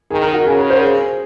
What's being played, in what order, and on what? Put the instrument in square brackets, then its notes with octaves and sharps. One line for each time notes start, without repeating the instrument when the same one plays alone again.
[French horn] D#3 [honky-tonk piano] G#4
[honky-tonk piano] A#4
F#4
[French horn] C#3 [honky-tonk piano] G#4
[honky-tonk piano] A#4
C5
G#4